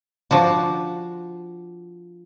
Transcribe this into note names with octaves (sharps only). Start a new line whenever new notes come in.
F3 D4 F#4